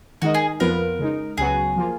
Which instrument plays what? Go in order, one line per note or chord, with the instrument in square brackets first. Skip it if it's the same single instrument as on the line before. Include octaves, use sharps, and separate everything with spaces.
[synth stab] D#3 G#3 D#4 A#4 D#5 [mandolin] F#4
[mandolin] G#4
[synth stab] F2 F3 B3 F4 B4 [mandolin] A#4
[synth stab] C#3 G#3 D#4
[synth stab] C#2 C#3 F#3 B3 F#4 [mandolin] G#4
[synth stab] F3 A#3 F4